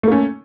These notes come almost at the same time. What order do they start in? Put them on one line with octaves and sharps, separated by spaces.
A3 A#3 C#4